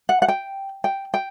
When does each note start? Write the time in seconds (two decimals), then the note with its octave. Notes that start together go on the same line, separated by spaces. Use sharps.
0.09 F#5
0.22 F#5
0.28 G5
0.84 G5
1.14 G5